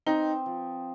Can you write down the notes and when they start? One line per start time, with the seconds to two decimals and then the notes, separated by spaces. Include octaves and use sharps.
0.06 C4 D#4
0.46 F3